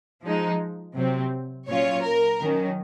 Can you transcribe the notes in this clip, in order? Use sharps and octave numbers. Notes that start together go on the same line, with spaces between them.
F3 G#3 D#4
C3 F#3 C4
A#2 F#3 C#4 F4 C#5
A#4
D#3 F#3 C#4